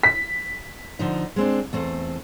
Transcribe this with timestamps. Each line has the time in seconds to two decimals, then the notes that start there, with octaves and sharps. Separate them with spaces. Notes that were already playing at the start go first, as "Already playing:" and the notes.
0.03 B6
0.99 D3 F3 D#4
1.36 G#3 C4 D4
1.73 E2 A3 C4